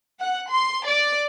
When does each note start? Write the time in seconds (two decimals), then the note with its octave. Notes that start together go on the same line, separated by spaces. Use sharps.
0.19 F#5 F#6
0.51 C6
0.87 D5